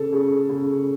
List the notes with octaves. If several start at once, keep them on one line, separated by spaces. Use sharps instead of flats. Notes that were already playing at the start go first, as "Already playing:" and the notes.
Already playing: C#3 A4
C#3
C#3